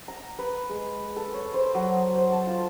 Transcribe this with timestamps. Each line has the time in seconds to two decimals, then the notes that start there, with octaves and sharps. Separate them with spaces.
0.08 A#5
0.39 B4
0.69 G#3
1.16 A4
1.34 C#5
1.54 C5
1.75 F#3
1.96 D#6
2.16 C5
2.32 A5
2.47 F4